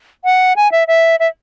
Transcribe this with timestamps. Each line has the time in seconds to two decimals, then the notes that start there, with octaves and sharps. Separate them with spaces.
0.25 F#5
0.56 G#5
0.72 E5
0.88 E5
1.20 E5